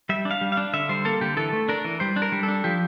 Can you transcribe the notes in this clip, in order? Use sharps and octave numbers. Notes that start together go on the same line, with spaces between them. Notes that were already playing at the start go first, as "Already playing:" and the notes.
G3 E5
D4
F5
G3
D4 F5
D3 E5
G3 C5
A#3 A4
D3 G4
E3 A4
A3
D4 A#4
E3
G3 C5
D4
A#4
G3
A4
D4
F3 G4